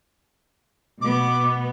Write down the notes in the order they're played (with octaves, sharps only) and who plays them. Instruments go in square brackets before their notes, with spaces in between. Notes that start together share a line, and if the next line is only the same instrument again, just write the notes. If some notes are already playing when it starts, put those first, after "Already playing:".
[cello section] B2 B3 [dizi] D6